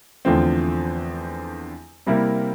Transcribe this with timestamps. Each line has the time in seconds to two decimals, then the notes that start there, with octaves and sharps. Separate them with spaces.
0.25 E2 D3 F3 A3 C4
2.07 C3 G3 A#3 E4 A#4